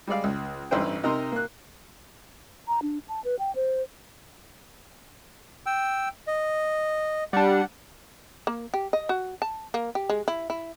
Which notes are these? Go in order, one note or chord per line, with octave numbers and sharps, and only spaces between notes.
G3 G#3 D5 F5
C#2
A1 G2 D#4 E4 C5 G5
C3 D#4 A#4 A#5 C6
A#3 F#6
A#5
D4
A5
B4
G5
C5
G5 E6
D#5
G3 D4 F#5
A#3
G4
D#5
F#4
A5
A#3
G4
G#3
E4
E4